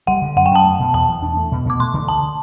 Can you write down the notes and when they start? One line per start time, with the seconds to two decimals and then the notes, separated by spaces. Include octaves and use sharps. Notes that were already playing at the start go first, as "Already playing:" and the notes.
0.07 G3 F#5
0.22 D3
0.36 F#2 F#5
0.46 G5
0.51 F#2 A5
0.64 A3
0.79 B2
0.94 E2 A5
1.08 E2
1.23 D4
1.37 A3
1.52 B2
1.66 B2 D6
1.80 A3 C6
1.94 D3
2.08 D2 A5